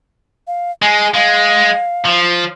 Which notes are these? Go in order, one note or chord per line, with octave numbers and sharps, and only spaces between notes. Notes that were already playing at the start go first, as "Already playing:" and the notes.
F5
G#3 G#5
G#3 F5
F3